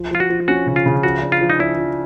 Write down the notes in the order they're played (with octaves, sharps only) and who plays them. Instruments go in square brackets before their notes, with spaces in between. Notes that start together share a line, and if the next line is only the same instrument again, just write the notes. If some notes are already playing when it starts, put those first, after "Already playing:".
Already playing: [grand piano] F3
[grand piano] F3 [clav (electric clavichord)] F4
[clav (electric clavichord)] F#4
[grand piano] F3
[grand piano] C#4 [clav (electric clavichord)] F#4
[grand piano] C#3
[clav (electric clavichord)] F4
[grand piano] C#3
[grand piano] F3 [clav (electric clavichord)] F#4
[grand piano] D4
[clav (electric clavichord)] F4
[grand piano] F3
[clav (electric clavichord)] D#4
[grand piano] D4 [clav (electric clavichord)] E4
[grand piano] F3